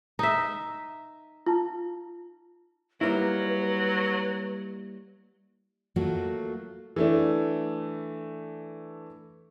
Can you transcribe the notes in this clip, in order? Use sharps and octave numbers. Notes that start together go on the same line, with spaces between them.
D#4 E5
F4 A5
F#3 G3 A#3 E4 B4
F#3 A3 A#3 F4 F#4
E3 A3 D4